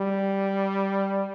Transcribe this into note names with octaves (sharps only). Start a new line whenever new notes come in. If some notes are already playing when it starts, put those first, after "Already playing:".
Already playing: G3